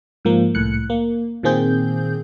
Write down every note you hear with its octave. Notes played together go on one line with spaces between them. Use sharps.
G#2 F3 A#3
C2 A2 F#6 C#7
A#3
A#2 D#3 A#3 C4 G#4 G6